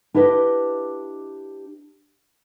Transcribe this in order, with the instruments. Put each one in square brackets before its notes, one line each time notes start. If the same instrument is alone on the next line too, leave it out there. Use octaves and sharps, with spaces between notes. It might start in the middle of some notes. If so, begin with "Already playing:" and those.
[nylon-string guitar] D4 E4 G4 B4 D5 D#5